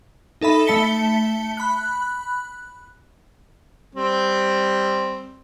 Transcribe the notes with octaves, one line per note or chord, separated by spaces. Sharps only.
D#4 A4 E5 B5
A3 E5 A5 B6 C#7 G7
B5 F#6
G3 C4